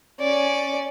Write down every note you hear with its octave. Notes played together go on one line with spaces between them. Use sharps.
C#4 D5